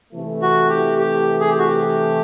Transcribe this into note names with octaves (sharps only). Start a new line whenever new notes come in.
C3 E3 A3
F#4
G4
G4
G#4
G4
F#4
G4